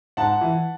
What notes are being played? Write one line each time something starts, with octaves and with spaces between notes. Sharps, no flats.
G#2 F#5 A5
E3